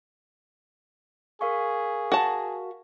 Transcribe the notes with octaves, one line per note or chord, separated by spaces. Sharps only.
G#4 A#4 F5 C#6
F#4 A5